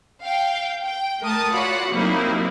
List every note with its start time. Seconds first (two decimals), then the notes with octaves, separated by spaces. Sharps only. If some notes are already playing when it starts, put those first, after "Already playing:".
0.24 F5 G5
0.83 G5
1.22 A3 A#4 A5 D#6
1.52 F4 F#4 C#5 D5 F#5 B5
1.90 C3 F#3 A#3 C4 D#4 E4